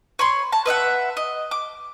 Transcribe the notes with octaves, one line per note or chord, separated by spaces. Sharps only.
C#5 B5 C6
A5
B4 D#5 E5 F#5
D#5
D6